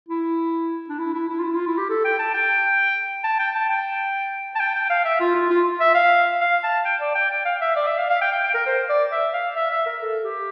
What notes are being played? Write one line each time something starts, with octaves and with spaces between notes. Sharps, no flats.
E4
D4
E4
E4
E4
F4
E4
F4
E4
G4
A4
G5
A5
G5
A5
G5
A5
G5
A5
G5
G5
F5
E5
F4
F4
F4
E5
F5
F5
A5
G5
D5
G5
G5
F5
E5
D5
E5
F5
F5
G5
G5
G5
A#4
C5
D5
E5
F5
E5
E5
A#4
A4
G4